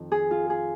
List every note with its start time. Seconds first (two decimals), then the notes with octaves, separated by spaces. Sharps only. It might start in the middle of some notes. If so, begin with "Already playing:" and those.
Already playing: F2 D#3
0.12 G#4
0.31 F4
0.50 G#4